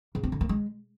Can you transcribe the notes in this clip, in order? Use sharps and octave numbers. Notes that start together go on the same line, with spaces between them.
C#3
C4
D3
A#3
G#3